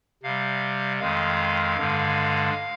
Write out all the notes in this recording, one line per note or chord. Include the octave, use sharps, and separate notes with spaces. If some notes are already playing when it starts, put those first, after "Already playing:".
C3 G3 F5
F2 D#3 G#3 F5
G2 D3 G#3